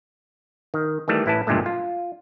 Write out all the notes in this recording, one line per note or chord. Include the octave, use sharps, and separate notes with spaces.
D#3
D#3 E3 G3 A3
A1 E4 B4 A5
B1 G2 A#2 D3 G#3 A3
F4